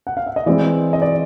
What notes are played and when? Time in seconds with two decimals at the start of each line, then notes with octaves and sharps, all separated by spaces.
0.07 F#5
0.17 F5
0.26 E5
0.36 D#5
0.46 E3 G#3 C4 D5
0.93 D#5
1.02 D5